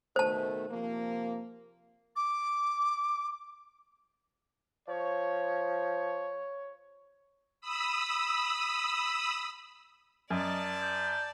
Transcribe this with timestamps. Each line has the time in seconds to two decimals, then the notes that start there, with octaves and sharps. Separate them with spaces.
0.16 B2 D#3 A3 C5 A5
0.69 C3 F3 A#3
2.16 D6
4.88 F3 C#5
7.61 B5 D#6 E6
10.30 F#2 D5 D#5 A5
10.82 G6